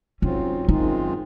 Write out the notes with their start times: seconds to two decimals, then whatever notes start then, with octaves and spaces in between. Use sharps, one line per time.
0.22 G#2 F#3 C4 C#4 F4
0.69 F#2 D#3 G#3 C4 D#4 F4